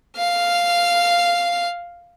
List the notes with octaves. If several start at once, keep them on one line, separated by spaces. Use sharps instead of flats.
F5 F6